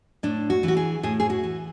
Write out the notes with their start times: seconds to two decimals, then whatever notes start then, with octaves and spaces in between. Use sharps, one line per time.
0.23 A2 D4
0.50 F#4
0.63 E3
0.68 F#4
0.77 G#4
1.03 A2 G#4
1.20 G#4
1.30 F#4
1.44 E3